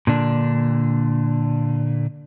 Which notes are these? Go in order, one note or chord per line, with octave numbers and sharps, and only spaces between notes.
A#2 D3 D4